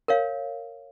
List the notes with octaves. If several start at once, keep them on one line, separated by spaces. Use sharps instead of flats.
A#4 C#5 F5